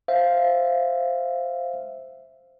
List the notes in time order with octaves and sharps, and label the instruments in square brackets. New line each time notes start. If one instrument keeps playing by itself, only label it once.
[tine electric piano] C5 E5 F5